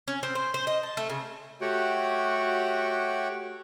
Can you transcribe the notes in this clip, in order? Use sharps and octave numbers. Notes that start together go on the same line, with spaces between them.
C#4
C4
C5
C5
D#5
A5
A3
C#3
A3 F#4 G4 C#5 F#5 G5